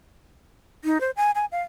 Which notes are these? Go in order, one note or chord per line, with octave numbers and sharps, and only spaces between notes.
D#4
C5
G#5
G#5
F5